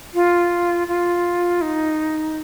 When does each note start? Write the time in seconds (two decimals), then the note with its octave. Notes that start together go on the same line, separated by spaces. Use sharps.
0.14 F4
0.87 F4
1.61 D#4